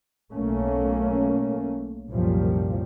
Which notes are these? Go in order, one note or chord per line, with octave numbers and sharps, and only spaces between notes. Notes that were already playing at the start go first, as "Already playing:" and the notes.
B1 A3 A#3 C#4
C2 F#2 A#2 F3 G3